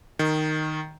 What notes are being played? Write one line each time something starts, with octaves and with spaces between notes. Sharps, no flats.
D#3